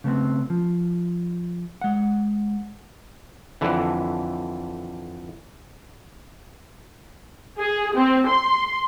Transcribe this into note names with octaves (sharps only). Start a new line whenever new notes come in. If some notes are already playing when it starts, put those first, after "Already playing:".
C#3 A3 B3 C4
F3
G#3 F#5
F2 D3 E3
G#4
C4
C6